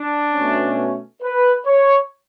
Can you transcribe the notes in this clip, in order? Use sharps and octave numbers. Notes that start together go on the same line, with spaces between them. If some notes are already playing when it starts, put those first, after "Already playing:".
Already playing: D4
B2 A3 C#4
B4
C#5